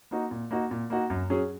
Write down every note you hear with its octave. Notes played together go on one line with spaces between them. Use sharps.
A#3 D#4 F#4
A#2
A#3 D#4 F#4
A#2
A#3 D#4 F#4
F#2
F#3 C#4 G#4